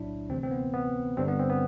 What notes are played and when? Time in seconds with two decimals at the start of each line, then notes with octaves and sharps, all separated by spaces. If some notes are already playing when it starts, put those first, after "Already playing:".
Already playing: B1 A2 F#3 D4 E4
0.29 D2 C3 E3 C4
0.43 C4
0.51 B3
0.74 B3
1.17 G1 G2 D3 G3 C4
1.28 B3
1.39 C4
1.50 B3